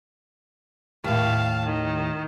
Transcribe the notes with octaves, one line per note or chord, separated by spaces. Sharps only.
D#2 A2 F5 A5
D#3